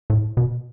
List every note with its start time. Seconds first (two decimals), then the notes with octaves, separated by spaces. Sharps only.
0.10 A2
0.37 B2